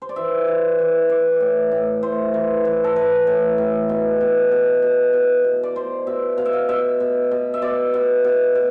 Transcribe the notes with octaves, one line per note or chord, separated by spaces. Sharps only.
C5
D5
E3 E5
E3
E3
E3 D5
A2
A2
A2 C5
E3
E3
A4
E3 B4
A2
A2
B2
B2
B2
B2
B2
B2
D5
B2 C5
B2 E5
B2 F5
E5
F5
B2 E5
B2
B2
E5
B2 D5
B2
B2
B2